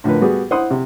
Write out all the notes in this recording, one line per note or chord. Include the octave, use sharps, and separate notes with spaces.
A2 D3 F3 A#4 B4
G3 B3 F#4 G#4
E4 C5 F#5 C6 D#6
C3